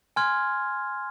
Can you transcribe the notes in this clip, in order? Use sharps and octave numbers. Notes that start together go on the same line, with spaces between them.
G#5 C6 F6 G#6